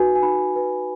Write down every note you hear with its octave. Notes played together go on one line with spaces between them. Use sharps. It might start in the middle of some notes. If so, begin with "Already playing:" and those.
Already playing: D#4 F#4 B4 G#5
G#5
D#4 B5
F#4 B4